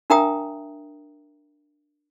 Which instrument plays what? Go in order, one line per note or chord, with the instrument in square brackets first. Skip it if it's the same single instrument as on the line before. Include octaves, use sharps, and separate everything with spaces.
[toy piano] D4 A#4 E5 G5 A#5 D#6